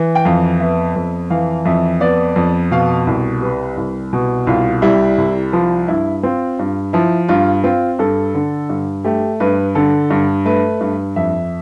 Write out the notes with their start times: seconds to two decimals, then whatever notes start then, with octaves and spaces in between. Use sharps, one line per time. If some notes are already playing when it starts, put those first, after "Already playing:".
Already playing: E3
0.15 G5
0.25 F2 F5
0.60 B3 E5
0.96 F2
1.30 E3 F5
1.65 F2 E5
2.00 B3 D5
2.36 F2
2.71 B2 F5
3.07 C2
3.41 G3 B4
3.77 C2
4.13 B2
4.47 C2 F4
4.82 G3 E4
5.18 C2
5.53 F3 F4
5.88 G2 E4
6.23 C4 F4
6.59 G2
6.93 F3 E4
7.28 G2 F4
7.64 C4 F4
7.99 G2 A4
8.34 D3
8.69 G2
9.04 A3 G4
9.40 G2 B4
9.75 D3 A4
10.10 G2
10.45 A3 B4
10.81 G2
11.16 F2 E5